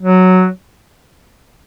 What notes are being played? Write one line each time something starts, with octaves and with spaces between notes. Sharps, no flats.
F#3